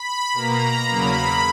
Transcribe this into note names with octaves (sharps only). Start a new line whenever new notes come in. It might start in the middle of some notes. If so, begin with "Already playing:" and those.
Already playing: B5
B2 A#3 A#5
E2 C#3 F#3 A#3 B5